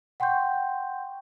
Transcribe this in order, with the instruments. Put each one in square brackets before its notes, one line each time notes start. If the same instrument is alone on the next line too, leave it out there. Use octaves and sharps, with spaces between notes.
[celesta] F#5 G5 C6 C#6 G6